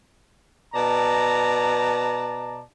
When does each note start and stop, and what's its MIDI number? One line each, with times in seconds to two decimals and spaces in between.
0.74 2.61 47
0.74 2.61 74
0.74 2.61 81
0.74 2.61 82